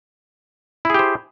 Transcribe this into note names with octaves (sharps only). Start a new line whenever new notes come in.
E4 G4 G#4 C5